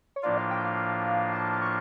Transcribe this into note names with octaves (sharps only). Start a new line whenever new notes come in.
C#5
A2 F3 A#3 D4 F4 D5
F5
G5
F5
A5
C#6